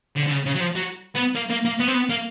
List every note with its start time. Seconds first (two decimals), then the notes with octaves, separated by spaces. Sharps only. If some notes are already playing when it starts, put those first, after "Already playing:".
0.16 D3
0.27 D3
0.31 C#3
0.46 C#3
0.55 F#3
0.61 F3
0.76 F#3
1.15 B3
1.35 A#3
1.50 A#3
1.65 A#3
1.80 B3
1.88 C4
1.94 B3
2.10 A#3